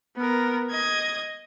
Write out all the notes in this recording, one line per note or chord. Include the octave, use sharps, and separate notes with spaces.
B3 A#4
D#5 G#6